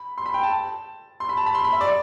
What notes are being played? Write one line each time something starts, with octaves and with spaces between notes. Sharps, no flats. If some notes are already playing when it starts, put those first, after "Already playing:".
Already playing: B5
C6
B5
G5
A5
C6
B5
A5
B5
C6
B5
E5
D5